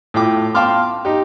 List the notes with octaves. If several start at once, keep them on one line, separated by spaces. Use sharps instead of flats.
A2 F4 G5 D6
F5 G5 A5 C6 D6 F6
D#4 G4